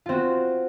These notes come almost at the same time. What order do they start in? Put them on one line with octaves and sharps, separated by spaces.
F4 C4 F#4